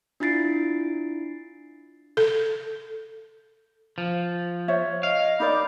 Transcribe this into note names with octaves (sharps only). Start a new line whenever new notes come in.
D4 E4 F4 A6 C7 D7
A4
F3
C5 C#5 E5
D#5 F5
D#4 A#4 D5 B5 D6 G6